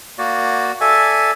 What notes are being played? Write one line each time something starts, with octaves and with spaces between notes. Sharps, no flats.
A#3 F#4 D5
A4 D5 E5 G#5